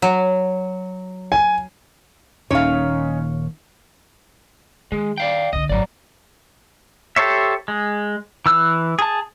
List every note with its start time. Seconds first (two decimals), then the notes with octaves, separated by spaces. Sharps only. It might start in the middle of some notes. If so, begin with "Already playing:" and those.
0.02 F#3
1.32 G#5
2.51 D#1 D#2 A#2 C#4 D#4 C#5 F5
4.92 D#3 G#3
5.18 D5 F5 G5
5.53 C2 D3 D#5
5.69 G#1 F#2 F#3 D5
7.16 G4 A4 C5 C#5 E5
7.68 G#3
8.46 E3 E6 F#6
8.99 G#4 A5